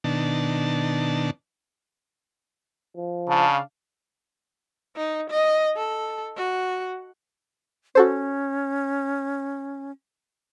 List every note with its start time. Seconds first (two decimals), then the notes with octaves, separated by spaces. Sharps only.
0.04 B2 D#3 D4 A5
2.97 F3
3.28 C#3 D4 F5 A5
4.96 D#4
5.30 D#5
5.76 A4
6.37 F#4
7.95 C#4 F#4 A4 C5